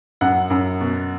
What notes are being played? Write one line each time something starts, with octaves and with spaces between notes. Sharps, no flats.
F#2 F#5
F#2
B2